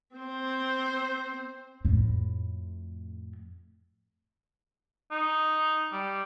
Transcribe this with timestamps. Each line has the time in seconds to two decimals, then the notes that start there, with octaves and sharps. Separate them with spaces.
0.16 C4 C5
1.85 F2 A2
5.12 D#4
5.92 G3